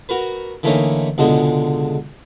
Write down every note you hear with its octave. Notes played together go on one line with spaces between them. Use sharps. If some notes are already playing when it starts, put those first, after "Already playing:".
F#4 A#4 B4
D3 E3 A3 A#3 C#4 D#4
C#2 B2 D3 G#3